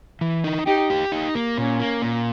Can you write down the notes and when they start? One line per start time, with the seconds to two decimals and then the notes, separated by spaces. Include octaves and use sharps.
0.21 E3
0.44 D#4
0.66 D#4 G4
0.90 G4
1.12 D#4
1.35 A#3
1.58 A#2 C#4
1.80 A#3
2.02 A#2